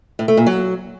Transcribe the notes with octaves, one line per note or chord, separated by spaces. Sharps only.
A2
A3
A#2
F#3